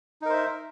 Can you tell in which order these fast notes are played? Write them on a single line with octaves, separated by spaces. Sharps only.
D#4 A#4 C5 E5